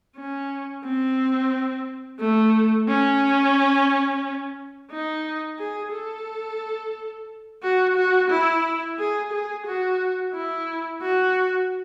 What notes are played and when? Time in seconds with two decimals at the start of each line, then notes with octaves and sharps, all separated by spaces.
0.16 C#4
0.85 C4
2.20 A3
2.88 C#4
4.91 D#4
5.59 G#4
5.93 A4
7.63 F#4
7.97 F#4
8.30 E4
8.99 G#4
9.32 G#4
9.66 F#4
10.34 E4
11.02 F#4